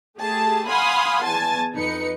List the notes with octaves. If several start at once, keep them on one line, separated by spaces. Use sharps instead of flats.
A3 G4 G#4 A5
F5 F#5 G#5 B5 C6 D#6
E2 G#5 A5 A6
F2 D#4 B4 C#7